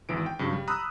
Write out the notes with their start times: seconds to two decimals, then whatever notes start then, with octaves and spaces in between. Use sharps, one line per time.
0.09 G#1 E2 E3 D7
0.26 G5
0.39 G2 C#3 F#3
0.52 G3
0.68 A#5 B5 D#6 E6 F#6